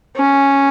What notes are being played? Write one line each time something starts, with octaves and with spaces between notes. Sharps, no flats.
C#4